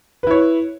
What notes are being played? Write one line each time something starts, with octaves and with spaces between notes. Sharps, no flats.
E4 B4 C#5